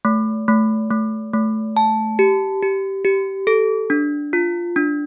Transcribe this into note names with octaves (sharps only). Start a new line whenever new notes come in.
A3
A3
A3
A3
A5
G4
G4
G4
A4
D4
F4
D4